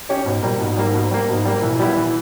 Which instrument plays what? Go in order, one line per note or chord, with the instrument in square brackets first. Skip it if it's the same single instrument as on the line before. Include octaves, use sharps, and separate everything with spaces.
[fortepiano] C#4 G4 C#5
[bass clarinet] G#2 [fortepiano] B2
[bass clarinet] A#2 [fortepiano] G3 A#3
[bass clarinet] G#2 [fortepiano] B2
[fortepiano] G3 A#3
B2
G3 A#3
[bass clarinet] G#2 [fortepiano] B2
[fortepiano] G3 A#3
[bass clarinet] A#2 [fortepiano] E3
[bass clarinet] B2
[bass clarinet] A#2 [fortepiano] G3 B3 E4
[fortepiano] E3